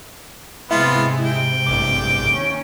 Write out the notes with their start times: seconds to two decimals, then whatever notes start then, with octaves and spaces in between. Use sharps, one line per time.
0.71 G#2 C3 G#3 B3 E4 F4 E5
1.26 G5
1.67 A1 G2 D6
2.30 D#2 C#4